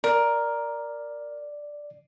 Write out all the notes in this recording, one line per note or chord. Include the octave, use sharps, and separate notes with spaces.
A#4 D5